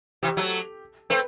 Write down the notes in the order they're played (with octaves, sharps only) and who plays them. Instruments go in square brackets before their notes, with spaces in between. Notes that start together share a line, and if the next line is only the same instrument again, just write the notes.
[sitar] C3 E3 [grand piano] G4
[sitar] F#3 A3 [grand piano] A4
[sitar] A3 C4 [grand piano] B4